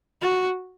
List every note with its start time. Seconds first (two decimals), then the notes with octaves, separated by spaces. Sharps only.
0.22 F#4